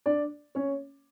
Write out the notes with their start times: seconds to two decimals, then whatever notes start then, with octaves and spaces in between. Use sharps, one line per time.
0.06 D4 D5
0.55 C#4 C#5